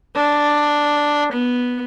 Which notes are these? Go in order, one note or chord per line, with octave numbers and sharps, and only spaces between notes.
D4
B3